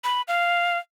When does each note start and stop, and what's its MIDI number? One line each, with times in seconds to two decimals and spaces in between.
0.04 0.22 83
0.28 0.78 77